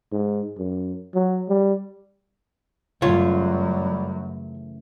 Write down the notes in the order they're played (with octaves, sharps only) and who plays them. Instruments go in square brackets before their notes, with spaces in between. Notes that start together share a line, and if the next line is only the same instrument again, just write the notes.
[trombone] G#2
F#2
F#3
G3
[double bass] F#2 [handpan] C#3 E3 A3 [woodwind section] F#3 G3 [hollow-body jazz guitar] F4 C#5